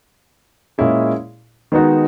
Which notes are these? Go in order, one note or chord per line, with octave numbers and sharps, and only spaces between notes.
A#2 G#3 C#4 E4 G#4
D#3 G#3 B3 D#4 F#4